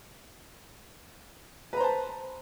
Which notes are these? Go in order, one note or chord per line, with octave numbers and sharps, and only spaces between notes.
B4 C5 A5 A#5